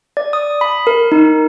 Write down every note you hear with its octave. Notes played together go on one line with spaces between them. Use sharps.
D5
D#6
B5
A#4
D#4